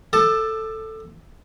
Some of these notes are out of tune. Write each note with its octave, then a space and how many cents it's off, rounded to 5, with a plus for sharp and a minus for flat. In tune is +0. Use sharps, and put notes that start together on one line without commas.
A4 +5 A5 +0 D6 +40